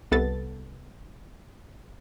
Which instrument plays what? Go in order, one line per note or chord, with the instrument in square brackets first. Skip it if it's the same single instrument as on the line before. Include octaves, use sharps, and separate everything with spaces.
[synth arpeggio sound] C2 B3 A4 A6